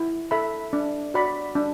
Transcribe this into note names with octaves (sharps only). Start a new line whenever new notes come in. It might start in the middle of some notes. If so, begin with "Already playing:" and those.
Already playing: E4
A4 E5 B5
D4
F#4 D5 B5
D4